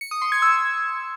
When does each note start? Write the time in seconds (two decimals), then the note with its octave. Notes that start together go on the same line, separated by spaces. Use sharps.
0.01 C#7
0.11 D#6
0.22 C6
0.32 G#6
0.42 E6